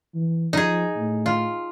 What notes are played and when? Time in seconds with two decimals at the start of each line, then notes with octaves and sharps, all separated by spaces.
0.15 E3
0.53 F3 D#4 G#4
0.96 A2
1.26 F4